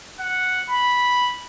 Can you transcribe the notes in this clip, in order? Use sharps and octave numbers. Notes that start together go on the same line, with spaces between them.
F#5
B5